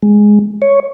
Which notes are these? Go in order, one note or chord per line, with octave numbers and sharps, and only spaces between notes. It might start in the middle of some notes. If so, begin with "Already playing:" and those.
G#3
C#5